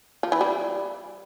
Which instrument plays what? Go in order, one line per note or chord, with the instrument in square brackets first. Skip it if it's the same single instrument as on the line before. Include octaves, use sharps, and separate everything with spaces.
[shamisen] F3
E3
G3